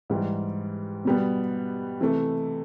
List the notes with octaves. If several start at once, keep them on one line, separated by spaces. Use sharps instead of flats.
G#2 E3 G3
B2 G3 B3
C3 E3 A3